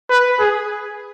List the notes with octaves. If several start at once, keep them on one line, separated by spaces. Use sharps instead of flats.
B4
G#4